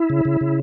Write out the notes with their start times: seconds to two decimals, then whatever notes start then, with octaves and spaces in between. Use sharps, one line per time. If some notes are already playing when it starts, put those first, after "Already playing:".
Already playing: E4
0.10 C#3
0.25 C#3
0.41 C#3